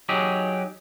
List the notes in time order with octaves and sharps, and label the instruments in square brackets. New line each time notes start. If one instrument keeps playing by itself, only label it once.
[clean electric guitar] F#3 D#4 G4 G#4